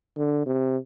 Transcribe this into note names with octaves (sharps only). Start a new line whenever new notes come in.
D3
C3